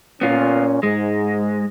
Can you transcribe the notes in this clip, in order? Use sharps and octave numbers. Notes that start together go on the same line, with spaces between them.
A#2 B3 C#4 F4
G#2 G#3